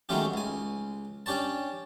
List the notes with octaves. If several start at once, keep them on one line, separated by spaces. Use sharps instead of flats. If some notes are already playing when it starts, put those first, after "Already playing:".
D#3 F#3 G#3 A3 C#4 G4
C#2 G#5
C#4 D4 G4 C#5 A5